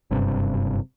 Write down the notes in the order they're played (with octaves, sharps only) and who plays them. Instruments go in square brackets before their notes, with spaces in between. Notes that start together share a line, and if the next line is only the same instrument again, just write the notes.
[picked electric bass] F#1 G2 C3